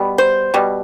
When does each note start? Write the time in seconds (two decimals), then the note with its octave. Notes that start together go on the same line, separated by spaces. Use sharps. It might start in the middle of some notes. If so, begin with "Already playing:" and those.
Already playing: B2 G3 B3
0.18 C5
0.54 B2 G3